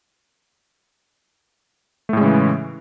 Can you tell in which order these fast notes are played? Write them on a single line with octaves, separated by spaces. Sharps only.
A3 A2 G#3 C#3 E3